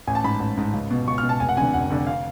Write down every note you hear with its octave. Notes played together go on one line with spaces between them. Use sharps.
A1 G#5
A5
G#2 B5
A1
G#2
C#2
B2
C#2 C#6
F6
B2
A5
F1 G#5
F#5
F2 D3 G#5
F1 F#5
F2 D3
F5